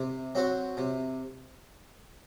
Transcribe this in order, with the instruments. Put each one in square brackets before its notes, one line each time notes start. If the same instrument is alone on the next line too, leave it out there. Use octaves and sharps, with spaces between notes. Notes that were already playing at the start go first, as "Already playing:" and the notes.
Already playing: [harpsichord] C3
F#3 C4 F#4
C3